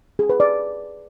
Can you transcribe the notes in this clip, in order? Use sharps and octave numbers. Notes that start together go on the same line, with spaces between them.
G#4
B4
D5